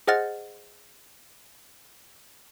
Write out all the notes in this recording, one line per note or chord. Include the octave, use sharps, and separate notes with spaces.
G#4 C5 D#5 F#5 F6 A6